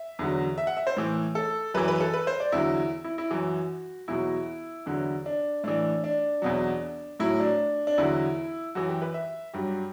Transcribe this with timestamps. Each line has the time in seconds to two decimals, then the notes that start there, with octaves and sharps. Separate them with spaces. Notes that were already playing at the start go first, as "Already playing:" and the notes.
Already playing: E5
0.19 E2 D3 F#3
0.58 E5
0.67 F#5
0.77 E5
0.87 C5
0.97 A2 E3
1.35 A4
1.74 F#2 E3 B4
1.88 B4
2.00 A4
2.14 B4
2.27 C5
2.40 D5
2.52 E2 D3 F#3 E4
3.04 E4
3.18 E4
3.30 F#2 E3 F#4
4.08 E2 B2 F#3 E4
4.86 E2 D3 F#3
5.26 D4
5.64 A2 E3 D4
6.04 D4
6.42 E2 B2 F#3
7.20 A2 F#3 E4
7.40 D4
7.87 D4
7.98 E2 D3 F#3 E4
8.75 F#2 E3 F#4
8.89 G4
9.02 B4
9.14 E5
9.54 G2 F#3 G4